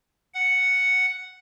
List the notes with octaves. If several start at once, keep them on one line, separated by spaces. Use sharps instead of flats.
F#5